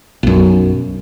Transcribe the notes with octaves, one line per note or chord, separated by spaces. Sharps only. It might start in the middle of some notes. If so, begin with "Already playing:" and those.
B1 F#2